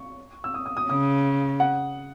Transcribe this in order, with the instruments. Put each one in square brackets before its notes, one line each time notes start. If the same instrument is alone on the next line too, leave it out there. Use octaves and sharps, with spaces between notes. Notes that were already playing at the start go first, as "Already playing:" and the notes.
Already playing: [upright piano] C#6
E6
D#6
D#6
D#6
[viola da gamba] C#3 [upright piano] D#6
[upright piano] F#5